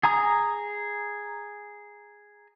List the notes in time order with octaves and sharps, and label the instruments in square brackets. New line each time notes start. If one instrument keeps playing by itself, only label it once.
[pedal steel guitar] G#4 G#5 A#5 D#6